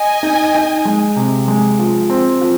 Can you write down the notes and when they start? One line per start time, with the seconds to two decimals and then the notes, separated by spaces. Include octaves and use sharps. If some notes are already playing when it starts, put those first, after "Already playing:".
Already playing: D#5 G#5
0.23 D#4
0.55 D#4
0.85 G#3
1.16 C3
1.48 G#3
1.79 F3
2.10 C4
2.41 F3